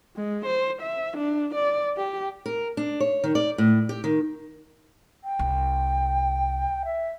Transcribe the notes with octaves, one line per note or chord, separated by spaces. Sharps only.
G#3
C5
E5
D4
D5
G4
A#4
D4
C#5
D#3
D5
A2
G4
D#3
G5
C2
E5